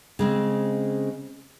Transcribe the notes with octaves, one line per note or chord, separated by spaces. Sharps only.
C#3 G#3 C4